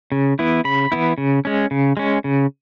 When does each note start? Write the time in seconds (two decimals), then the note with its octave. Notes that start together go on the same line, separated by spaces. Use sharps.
0.12 C#3
0.39 E3 B3 E4
0.65 C#3 B5
0.92 E3 B3 E4
1.18 C#3
1.45 G#3 C#4
1.71 C#3
1.97 G#3 C#4
2.24 C#3